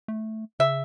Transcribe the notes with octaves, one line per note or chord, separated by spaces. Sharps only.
A3
C#3 E5